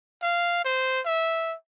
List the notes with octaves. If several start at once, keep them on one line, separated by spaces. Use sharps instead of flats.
F5
C5
E5